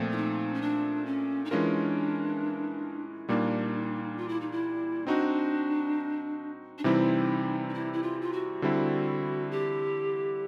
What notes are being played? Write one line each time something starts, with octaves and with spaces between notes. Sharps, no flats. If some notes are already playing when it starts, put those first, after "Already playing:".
Already playing: A#2 F3 A3 C4
E4
D#4
C#4
D4
C#4
D#4
E3 G#3 C#4 D4 F4 A#4
A#2 G3 A#3 D4 D#4
F4
E4
D#4
E4
C4 D4 D#4 F#4
D4
C3 E3 G3 C4 D#4 E4
D#4
E4
E4
F4
F4
F#4
D3 G3 C4 E4
G4